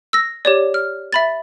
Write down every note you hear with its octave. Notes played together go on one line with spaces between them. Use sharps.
E6 A#6
G4 C#5 D5
F6
E5 B5 A6